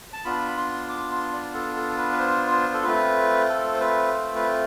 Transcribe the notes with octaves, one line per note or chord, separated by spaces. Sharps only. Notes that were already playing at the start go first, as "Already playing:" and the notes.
A5
B3 D4 F4 B5
B5
C6
D6
C6
D5
A4
A4
B4
B4
C5
C5
A4
A3 C4 F4 B4
A4
C5
B4
C5
B4